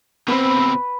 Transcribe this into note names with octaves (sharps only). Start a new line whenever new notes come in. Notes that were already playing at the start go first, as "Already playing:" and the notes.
B2 C4 B4